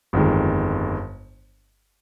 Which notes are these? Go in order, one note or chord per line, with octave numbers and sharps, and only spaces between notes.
G1 F2 D#3 G#3